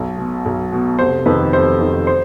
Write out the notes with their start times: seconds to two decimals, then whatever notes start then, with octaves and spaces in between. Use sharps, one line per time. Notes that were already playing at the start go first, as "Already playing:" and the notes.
Already playing: B1
0.18 B2
0.45 B1
0.72 B2
0.99 F1 C5
1.26 F2 D#3 B4
1.53 F1 C5
1.81 F2 D#3
2.07 C5